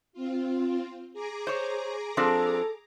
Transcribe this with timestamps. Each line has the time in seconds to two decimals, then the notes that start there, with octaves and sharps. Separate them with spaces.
0.13 C4 F4
1.13 G#4 A#5 D6
1.47 C5 C#5
2.17 F3 C4 D4 A4